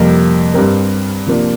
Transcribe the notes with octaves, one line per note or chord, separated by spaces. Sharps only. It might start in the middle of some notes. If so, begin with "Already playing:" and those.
Already playing: F2 C3 G3 A#3
G2 G3 C4 A#4
C3 F3 A#3 D4